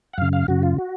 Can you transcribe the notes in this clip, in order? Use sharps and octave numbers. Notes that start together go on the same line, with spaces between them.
F#5
F#2 C#3 F5
F5
F#2 C#3 F#4
F4
F#4